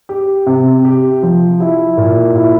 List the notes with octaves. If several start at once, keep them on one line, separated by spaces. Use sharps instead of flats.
G4
C3
G4
F3
E4
A#2
E4